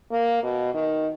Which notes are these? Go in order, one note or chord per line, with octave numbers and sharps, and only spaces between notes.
A#3
B2
D#3